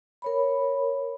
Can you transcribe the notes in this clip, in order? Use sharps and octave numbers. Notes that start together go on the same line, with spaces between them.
A#4 C#5 B5